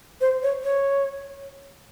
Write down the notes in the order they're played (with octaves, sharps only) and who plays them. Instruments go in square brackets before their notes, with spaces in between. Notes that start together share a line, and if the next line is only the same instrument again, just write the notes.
[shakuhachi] C5
C#5
C#5